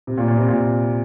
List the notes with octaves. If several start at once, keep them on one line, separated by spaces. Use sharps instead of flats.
C3
A#2
A#2
C3
A#2